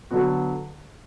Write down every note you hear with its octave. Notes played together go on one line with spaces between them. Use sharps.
D3 F#3 B3 F#4